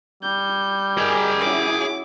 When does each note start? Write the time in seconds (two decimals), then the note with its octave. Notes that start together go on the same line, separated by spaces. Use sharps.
0.23 G3 G6
0.98 G#4 A#4 D#5 G5 G#5
1.41 C#4 E4 F#4 D6